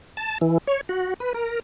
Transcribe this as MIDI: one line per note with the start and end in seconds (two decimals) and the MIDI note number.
0.17 0.38 81
0.41 0.58 52
0.67 0.81 73
0.89 1.14 66
1.20 1.33 71
1.34 1.60 70